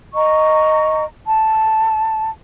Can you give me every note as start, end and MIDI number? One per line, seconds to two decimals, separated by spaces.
0.13 1.03 75
0.13 1.03 82
0.13 1.03 85
1.24 2.30 81